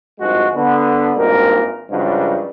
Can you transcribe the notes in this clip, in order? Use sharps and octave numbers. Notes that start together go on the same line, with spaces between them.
G#1 G2 F3 G#3 F#4
D3 B3
G#1 G2 A#2 A#4
G2 C#3 F3 F#3 G#3